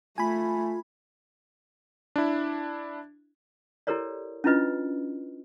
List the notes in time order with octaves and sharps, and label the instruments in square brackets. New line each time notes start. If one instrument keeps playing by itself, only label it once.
[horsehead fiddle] A3 [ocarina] F4 [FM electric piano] G#5 B5
[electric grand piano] D4 E4
[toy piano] E4 G4 A4 A#4 C#5 D5
C#4 D4 E4 F4 B4 D#5